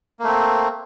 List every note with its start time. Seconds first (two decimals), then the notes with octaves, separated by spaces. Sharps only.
0.19 A#3
0.24 A3
0.28 C4